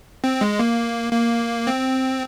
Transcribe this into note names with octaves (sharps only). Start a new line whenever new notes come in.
C4
G#3
A#3
A#3
C4